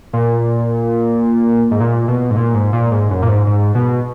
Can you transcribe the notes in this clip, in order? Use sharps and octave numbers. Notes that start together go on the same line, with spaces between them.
A#2
G#2
A#2
B2
G#2
A#2
G#2
A#2
G#2
F#2
A#2
G#2
G#2
B2